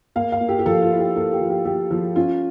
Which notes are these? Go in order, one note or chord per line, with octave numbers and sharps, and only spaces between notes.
A#3 F5
F5
A#3
G4
G4
F3 A4
F4
E4
G4
A#3 A4
G4
F3
G4
F3 G4
F3
C#4 F4